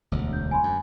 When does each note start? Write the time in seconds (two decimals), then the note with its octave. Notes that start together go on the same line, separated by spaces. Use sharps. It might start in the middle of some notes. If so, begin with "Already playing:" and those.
0.12 E1 D2
0.33 G6
0.51 G#5 B5 C6
0.63 F#2